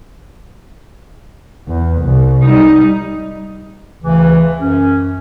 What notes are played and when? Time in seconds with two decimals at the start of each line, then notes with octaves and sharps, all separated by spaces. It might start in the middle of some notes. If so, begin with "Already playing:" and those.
1.68 E2
2.02 C2
2.43 G3 D#4
4.03 D2 C#3 E3
4.60 F#2 C#4